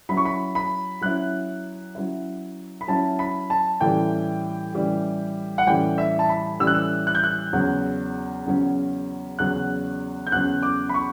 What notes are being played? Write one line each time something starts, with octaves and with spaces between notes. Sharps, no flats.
F#3 C#4 E4 B5
C#6
B5
B5
F#3 C#4 E4 F#6
F#3 C#4 E4
B5
F#3 C#4 E4 A5
B5
A5
A2 E3 G3 C#4 G4 G5
A2 E3 G3 C#4 G4
F#5
A2 E3 G3 C#4 G4 G5
E5
A5
B5
A2 E3 G3 C#4 G4 E6
F#6
E6
F#6
G6
F#6
E2 C#3 F#3 C#4
E2 C#3 F#3 C#4
E2 C#3 F#3 C#4 F#6
G6
E2 C#3 F#3 C#4 F#6
D6
B5
C#6